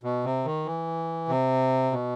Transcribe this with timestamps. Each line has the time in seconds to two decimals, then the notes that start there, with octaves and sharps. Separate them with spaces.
0.03 B2
0.24 C3
0.45 D#3
0.66 E3
1.29 C3
1.91 B2